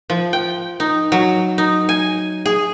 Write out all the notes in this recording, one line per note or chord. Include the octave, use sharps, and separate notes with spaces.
F3
G5
D#4
F#3
D#4
G#5
G#4